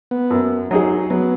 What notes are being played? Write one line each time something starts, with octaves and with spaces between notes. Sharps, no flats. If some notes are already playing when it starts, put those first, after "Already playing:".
B3
F#2
F#3 D#4 G#4
F#3 B3